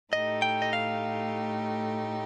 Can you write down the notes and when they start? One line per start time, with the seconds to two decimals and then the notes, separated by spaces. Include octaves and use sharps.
0.12 A2 A3 D#4 G4 D#5
0.42 G5
0.62 D#5
0.73 F5